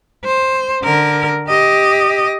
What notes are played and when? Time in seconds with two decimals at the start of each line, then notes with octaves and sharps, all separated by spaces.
0.25 C5
0.83 D3 A#4
1.48 G4 D#5